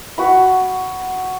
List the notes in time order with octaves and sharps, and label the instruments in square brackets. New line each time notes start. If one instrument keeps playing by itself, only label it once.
[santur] F#4 F#5 B5